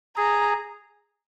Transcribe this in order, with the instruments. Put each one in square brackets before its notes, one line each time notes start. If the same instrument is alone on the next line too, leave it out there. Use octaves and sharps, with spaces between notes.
[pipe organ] G#4 [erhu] A#5